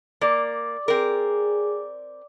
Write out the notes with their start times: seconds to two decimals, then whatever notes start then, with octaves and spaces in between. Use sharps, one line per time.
0.21 A#3 D5
0.88 C4 G#4 A#4